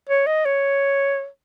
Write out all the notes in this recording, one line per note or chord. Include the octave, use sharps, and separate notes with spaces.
C#5
D#5
C#5